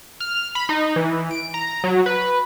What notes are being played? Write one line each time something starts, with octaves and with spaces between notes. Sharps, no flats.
F6
B5
D#4
E3
D7
A#5
F#3
B4